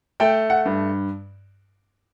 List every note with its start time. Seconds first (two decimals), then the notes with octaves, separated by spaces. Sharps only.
0.20 A3 G5
0.50 F#5
0.66 G2